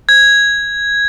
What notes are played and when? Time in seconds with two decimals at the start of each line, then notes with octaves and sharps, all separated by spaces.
0.09 G#6